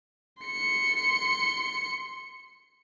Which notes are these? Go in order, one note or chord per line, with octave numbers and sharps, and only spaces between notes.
C6 C#7